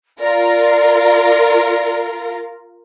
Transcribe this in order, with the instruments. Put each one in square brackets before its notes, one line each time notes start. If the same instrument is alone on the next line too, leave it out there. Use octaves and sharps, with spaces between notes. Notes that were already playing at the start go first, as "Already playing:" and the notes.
[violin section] F4 A#4 [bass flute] D5